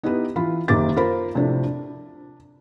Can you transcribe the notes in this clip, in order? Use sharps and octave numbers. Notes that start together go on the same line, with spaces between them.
B3 D#4 E4 G4 B4
E3 F4 B5
F#1 D#3 A#3 G4 D6 A6
F4 A#4 C5 B5
A2 C3 F3 A3 D4
D4